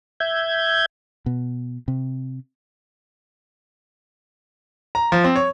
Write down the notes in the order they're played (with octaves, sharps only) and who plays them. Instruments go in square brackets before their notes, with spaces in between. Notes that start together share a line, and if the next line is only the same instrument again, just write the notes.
[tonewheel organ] E5 G6 G#6
[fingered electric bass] B2
C3
[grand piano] A#5
F3
C4
C#5